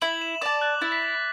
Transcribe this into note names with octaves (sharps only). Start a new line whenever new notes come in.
E4 F#7
E7
D5 A5 D6
F#6
E4 A6
B6
A6